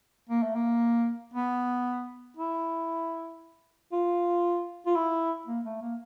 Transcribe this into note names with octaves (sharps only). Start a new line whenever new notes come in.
A#3
A3
A#3
B3
E4
F4
F4
E4
A#3
A3
A#3